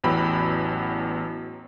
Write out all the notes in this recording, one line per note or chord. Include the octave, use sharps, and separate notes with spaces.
A1 E2 F#3 G5 B5 E6